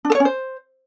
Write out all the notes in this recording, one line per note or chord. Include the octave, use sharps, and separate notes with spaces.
D4
A4
C#5
C#4
C5